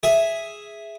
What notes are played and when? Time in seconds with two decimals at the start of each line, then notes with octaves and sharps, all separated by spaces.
0.03 G#4 E5